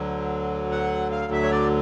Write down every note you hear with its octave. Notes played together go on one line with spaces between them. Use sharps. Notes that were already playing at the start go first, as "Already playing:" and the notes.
Already playing: D2 D3 F#3
F#5
F5
E5
C#5
D5